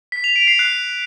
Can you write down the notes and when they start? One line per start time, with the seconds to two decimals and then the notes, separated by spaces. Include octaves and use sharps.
0.12 B6
0.24 F7
0.36 D7
0.47 C7
0.59 F#6